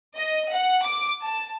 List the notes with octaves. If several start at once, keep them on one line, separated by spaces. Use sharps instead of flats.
D#5
F#5
D6
A5